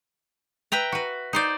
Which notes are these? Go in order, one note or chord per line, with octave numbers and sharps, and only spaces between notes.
B4 E5 G5 A#5
F#4 B4
D#4 C5 D5